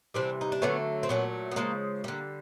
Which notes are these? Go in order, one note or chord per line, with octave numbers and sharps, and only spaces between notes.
C3 E3 G3 C4 D4
D#4
D4
D3 F#3 A3 B3 C#4
C4
A#2 F#3 A3 B3 C#4
B3
C#3 F3 G#3 A#3 C4
D3 G3 A#3